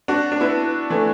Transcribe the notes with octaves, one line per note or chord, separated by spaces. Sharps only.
D4 F#4
D4
B3 E4
E3 A3